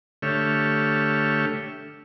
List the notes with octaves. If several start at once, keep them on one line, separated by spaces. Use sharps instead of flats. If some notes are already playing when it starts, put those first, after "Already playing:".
D3 A3 G4 C#5 E5 F6